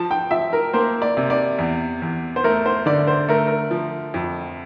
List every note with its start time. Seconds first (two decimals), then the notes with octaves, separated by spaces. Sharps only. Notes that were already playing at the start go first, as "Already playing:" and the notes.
Already playing: F3 A5
0.11 G5
0.31 F3 E5
0.53 A#4
0.74 A#3 C5
1.02 D5
1.17 C3
1.30 D5
1.58 E2
2.02 E2
2.36 C5
2.44 A3 A#4
2.66 C5
2.86 D3 D5
3.07 C5
3.28 A3 A#4
3.47 A#4
3.71 F3
4.14 F2